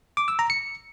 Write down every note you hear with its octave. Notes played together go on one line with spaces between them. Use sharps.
D6
E6
A#5
C#7